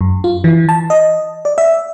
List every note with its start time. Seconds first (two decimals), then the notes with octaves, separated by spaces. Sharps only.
0.01 F#2
0.24 F4
0.44 E3
0.69 A5
0.90 D#5
1.45 D5
1.58 E5